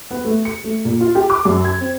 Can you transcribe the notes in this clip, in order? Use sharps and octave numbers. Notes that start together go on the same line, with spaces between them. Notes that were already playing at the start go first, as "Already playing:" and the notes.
B3
A3
C#7
A3
A#2
F4
G4
D6
F#2
G#6
C4